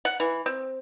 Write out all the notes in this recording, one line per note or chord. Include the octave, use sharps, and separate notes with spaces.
F#5
E3
C4